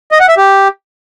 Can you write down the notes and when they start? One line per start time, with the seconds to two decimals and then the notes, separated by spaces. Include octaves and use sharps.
0.12 D#5
0.20 F#5
0.29 E5
0.37 G4